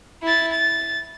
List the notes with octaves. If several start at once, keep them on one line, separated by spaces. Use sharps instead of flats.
E4 A6
A6